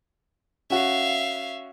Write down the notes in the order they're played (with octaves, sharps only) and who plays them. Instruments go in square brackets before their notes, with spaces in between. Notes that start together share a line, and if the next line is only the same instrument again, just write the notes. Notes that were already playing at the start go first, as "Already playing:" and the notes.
[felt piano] C#4 F#4 [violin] E5 F5